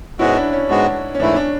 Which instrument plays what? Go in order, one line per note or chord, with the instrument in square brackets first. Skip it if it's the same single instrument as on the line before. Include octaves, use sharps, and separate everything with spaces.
[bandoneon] G#2 G#3 B3 F#4 [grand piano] C#4 E4
[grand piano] D4
C#4
[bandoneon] G#2 G#3 B3 F#4 [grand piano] D4
[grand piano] C#4
[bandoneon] G#2 E3 A3 E4 [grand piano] D4
[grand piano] C#4
D4